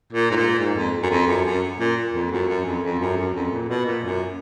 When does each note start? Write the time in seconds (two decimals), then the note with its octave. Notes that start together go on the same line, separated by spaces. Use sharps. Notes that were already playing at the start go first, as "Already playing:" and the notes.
0.12 A#2
0.31 G#2
0.36 A#2
0.58 G#2
0.75 F2
1.02 F#2
1.10 F2
1.27 F#2
1.44 F#2
1.79 A#2
2.14 F2
2.31 F#2
2.48 F#2
2.65 F2
2.83 F2
2.99 F#2
3.17 F#2
3.34 F2
3.51 A#2
3.68 B2
3.85 A#2
4.03 F#2